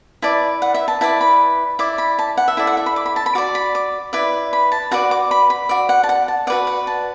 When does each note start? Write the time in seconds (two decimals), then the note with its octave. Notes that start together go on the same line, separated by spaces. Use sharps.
0.22 E4 B4 D5 A5
0.62 F#5
0.74 E5
0.88 A5
1.01 E4 B4 D5 A5
1.21 B5
1.79 E4 D5 D6
1.98 B5
2.19 A5
2.37 F#5
2.48 E5
2.57 E4 A4 D5
2.67 F#5
2.77 E5
2.86 B5
2.96 D6
3.06 B5
3.16 A5
3.26 B5
3.35 F#4 D5 D6
3.55 B5
3.75 D6
4.13 E4 B4 D5
4.53 B5
4.72 A5
4.91 F#4 B4 D5 F#5
5.11 D6
5.31 B5
5.50 B5
5.69 F#4 D5
5.89 F#5
6.03 A5
6.09 F#5
6.28 A5
6.47 F#4 B4 D5 F#5
6.67 F#5
6.87 A5